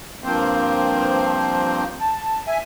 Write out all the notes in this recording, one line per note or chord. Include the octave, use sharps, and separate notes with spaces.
G2 F3 A#3 C4 C5
A5
E5 G#5